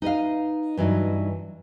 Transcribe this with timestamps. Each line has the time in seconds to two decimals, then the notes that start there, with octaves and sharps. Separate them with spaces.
0.02 D#4 B4 D#5 F5
0.77 G2 E3 F#3 D#4